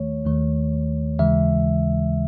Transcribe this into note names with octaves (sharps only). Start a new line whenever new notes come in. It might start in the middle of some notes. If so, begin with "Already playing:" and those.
Already playing: D#2 D#3 A3 C#5
D#2 D#3 A3
D#2 C#3 E3 G#3 E5